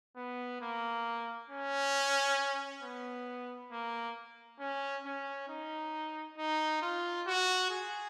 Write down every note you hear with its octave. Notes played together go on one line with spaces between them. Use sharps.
B3
A#3
C#4
B3
A#3
C#4
C#4
D#4
D#4
F4
F#4
G#4